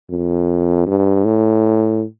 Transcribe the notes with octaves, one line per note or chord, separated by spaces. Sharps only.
F2
G2
A2